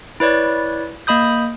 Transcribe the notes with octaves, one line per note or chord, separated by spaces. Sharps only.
E4 B4 C#5 D5
A#3 D#5 B5 D#6 G6